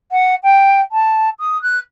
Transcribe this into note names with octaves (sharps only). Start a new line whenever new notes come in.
F#5
G5
A5
D#6
F#6